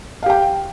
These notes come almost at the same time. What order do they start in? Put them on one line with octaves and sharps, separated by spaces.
F5 G4 G5